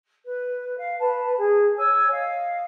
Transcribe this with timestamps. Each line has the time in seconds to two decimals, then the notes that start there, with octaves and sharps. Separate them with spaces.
0.26 B4
0.78 F5
0.99 B4 A5
1.37 G#4
1.77 C#5 G#5 E6
2.10 D#5 F5